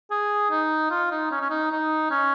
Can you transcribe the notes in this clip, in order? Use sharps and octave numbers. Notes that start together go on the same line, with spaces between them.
G#4
D#4
F4
D#4
C#4
C#4
D#4
D#4
C#4